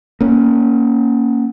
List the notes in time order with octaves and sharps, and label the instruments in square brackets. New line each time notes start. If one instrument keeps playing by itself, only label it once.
[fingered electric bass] A#3 C#4